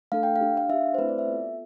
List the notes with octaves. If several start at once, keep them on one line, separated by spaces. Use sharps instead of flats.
A3 D4 A4 F5
G5
F5
D4 G4
F5
D4 G4 E5
C5
A3 C4 E4 G4 B4
D5
E5
B3 F4 A4